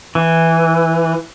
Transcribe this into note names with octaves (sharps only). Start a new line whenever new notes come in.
E3